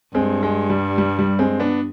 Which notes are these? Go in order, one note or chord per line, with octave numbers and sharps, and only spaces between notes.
G2 G#3 C4
G#3
G3
G3
G3
G#3 C4
B3 D4